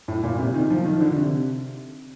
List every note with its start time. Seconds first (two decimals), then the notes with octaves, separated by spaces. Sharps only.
0.08 A2
0.23 A#2
0.39 C3
0.54 D#3
0.70 F3
0.85 D#3
1.01 D3
1.16 C3